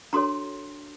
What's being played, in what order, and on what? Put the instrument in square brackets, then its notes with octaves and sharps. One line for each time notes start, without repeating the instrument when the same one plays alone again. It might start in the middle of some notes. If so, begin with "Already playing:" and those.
[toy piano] D4 F#4 A4 C#5 A#5 C6